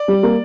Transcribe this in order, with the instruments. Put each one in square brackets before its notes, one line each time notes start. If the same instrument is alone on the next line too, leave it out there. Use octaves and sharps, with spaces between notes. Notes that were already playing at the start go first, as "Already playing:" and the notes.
Already playing: [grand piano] D5
[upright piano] G3
A#3